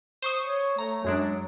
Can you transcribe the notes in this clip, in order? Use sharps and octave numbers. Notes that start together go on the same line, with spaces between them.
C5 C#6 D#6
C#5
A3 A#5
F#2 F#3 G#3 D4